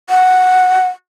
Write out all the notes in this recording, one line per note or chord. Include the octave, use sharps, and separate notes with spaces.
F#5